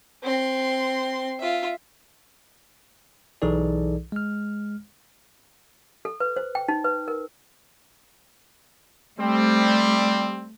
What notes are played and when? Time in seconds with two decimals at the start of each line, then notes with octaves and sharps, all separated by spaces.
0.23 C4 C6
1.40 F4 E5
3.42 B1 E3 D#4 G#4 A4 D5
4.12 G#3 F6
6.05 A4
6.20 B4
6.36 C5
6.55 G5
6.68 D#4
6.84 B4
7.08 A#4
9.20 G3 A3 C4